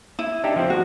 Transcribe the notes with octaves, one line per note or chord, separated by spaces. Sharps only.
E4
D4 D#4 G4
F3 C4
F#4